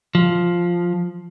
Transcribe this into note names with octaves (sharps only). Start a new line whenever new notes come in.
F3